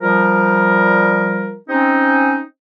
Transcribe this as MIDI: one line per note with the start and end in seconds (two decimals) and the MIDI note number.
0.01 1.55 53
0.01 1.55 55
0.01 1.55 70
1.68 2.41 60
1.68 2.41 61
1.68 2.41 63